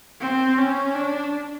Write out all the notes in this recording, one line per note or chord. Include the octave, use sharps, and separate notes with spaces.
C4
C#4
D4